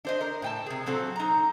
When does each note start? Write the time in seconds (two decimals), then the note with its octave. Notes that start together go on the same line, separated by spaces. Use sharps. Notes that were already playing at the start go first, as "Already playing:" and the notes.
0.05 D4 C5 D#5
0.21 A#4
0.42 A2 G5 A5
0.66 C3 G#4
0.86 A#2 F#3 C4 A4
1.16 D#4 A#5